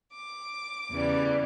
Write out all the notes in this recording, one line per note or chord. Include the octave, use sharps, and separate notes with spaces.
D6
E2 C#3 E3 G3